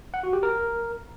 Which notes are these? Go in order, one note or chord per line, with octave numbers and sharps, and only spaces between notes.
F#5
F#4
G4
A#4